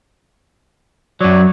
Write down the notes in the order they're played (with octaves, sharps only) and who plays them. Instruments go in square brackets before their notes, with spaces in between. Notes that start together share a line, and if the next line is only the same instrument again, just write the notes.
[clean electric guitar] F#2 F#3 [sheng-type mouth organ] C#5 D5